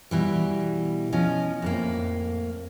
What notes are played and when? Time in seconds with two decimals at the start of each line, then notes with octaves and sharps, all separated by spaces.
0.11 B2 E3 G3
1.12 F3 C#4 D#5
1.62 F2 A2 A#3